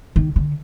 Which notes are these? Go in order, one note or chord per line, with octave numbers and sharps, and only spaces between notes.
D#3
D3